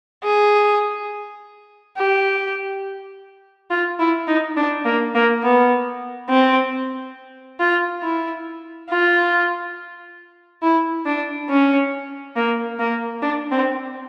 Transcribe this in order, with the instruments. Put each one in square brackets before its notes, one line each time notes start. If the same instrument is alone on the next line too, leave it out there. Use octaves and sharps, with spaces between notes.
[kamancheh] G#4
G4
F4
E4
D#4
D4
A#3
A#3
B3
C4
F4
E4
F4
E4
D4
C#4
A#3
A#3
D4
C4